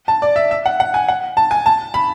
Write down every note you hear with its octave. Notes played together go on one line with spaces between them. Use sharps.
A5
D5
E5
E5
F#5
F#5
G#5
F#5
A5
G#5
A5
B5